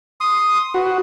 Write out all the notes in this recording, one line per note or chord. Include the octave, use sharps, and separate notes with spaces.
C6 D#6
F#4 B4